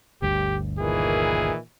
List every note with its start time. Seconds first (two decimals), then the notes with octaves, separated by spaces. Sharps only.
0.22 G1 D2 G2 G4
0.78 A#2 D#3 E3 G#4